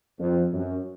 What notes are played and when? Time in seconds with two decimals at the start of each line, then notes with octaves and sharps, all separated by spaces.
0.19 F2
0.53 F#2